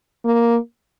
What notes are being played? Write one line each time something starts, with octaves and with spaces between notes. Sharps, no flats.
A#3